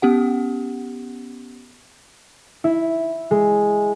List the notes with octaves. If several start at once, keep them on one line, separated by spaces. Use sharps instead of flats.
B3 C#4 G4 F#5
E4
G#3